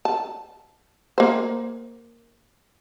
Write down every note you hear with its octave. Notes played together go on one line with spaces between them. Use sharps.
A5
A#3 C5